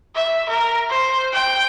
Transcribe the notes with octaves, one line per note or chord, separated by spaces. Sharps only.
E5
A#4
C5
G5